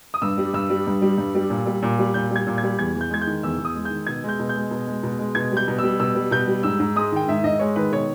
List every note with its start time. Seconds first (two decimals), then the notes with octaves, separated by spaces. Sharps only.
0.14 D#6
0.22 G2 E6
0.38 G3
0.54 G2 E6
0.70 G3
0.87 G2
1.02 G3
1.18 G2
1.35 G3
1.50 A#2
1.66 G3
1.82 A#2
1.99 G3
2.14 A#2 G6
2.31 G3 G#6
2.47 A#2
2.58 G#6
2.63 G3
2.79 E2 G#6
2.95 E2
3.01 G6
3.10 G#3 G#6
3.21 G6
3.27 D#3
3.43 E2 E6
3.58 E2
3.65 D#6
3.75 G#3
3.85 G6
3.91 D#3
4.07 B2 G#6
4.24 G#3 G6
4.39 B2
4.49 G6
4.56 G#3
4.71 B2
4.87 G#3
5.03 B2
5.19 G#3
5.35 B2 G#6
5.52 G3 G6
5.68 B2
5.78 G3 E6
6.00 B2 E6
6.15 G3
6.31 B2 G6
6.47 G3
6.63 G#2 E6
6.79 G#2
6.96 G#3 D#6
7.12 D#3 G5
7.28 G#2 E5
7.44 G#2 D#5
7.59 G#3 C#5
7.76 D#3 B4
7.92 B2 C#5